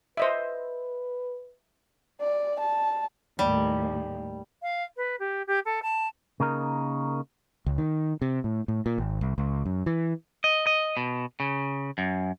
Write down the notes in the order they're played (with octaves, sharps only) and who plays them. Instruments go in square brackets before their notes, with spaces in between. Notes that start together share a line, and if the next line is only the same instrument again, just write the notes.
[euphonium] B4 [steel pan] C5 D#5 E5
[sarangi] D5
A5
[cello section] D#2 A2 [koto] G3
[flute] F5
B4
G4
G4
A4
A5
[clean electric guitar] C#3 A#3 D#4 A#4
[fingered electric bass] C#2
D#3
C3
A2
A2
A#2
G#1
C2
C#2
F#2
E3
[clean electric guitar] D#5
D#5
B2
C#3
F#2